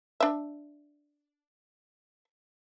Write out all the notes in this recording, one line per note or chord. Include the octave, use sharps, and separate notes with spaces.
D4 E5